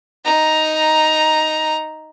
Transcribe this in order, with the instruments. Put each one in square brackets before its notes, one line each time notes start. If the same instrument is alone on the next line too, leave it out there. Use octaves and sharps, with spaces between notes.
[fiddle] D#4 A#5